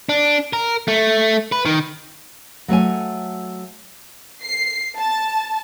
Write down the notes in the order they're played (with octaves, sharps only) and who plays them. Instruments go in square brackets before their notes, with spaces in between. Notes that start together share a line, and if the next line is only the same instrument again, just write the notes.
[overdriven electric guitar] D4
A#4
A3
B4
D#3
[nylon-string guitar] F#3 A3 C#5 G#5
[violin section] C7
A5